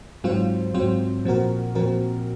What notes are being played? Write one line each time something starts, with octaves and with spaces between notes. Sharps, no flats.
G#2 F#3 C4 F4 C5
G#2 F#3 C4 F4 C5
A#2 F3 C4 F#4 A#4
A#2 F3 C4 F#4 A#4